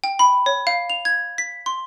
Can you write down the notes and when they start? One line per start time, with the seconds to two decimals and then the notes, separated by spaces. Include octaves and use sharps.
0.04 G5
0.19 B5
0.46 C#5
0.67 F5
0.90 F7
1.05 G#6
1.38 B6
1.66 C6